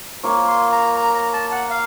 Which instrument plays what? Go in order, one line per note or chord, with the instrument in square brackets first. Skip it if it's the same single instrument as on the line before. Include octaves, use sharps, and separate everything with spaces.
[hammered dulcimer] A#3 F4 A#4 C#5
[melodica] C6
A#5
A#5
A#5
A5
F#5
F5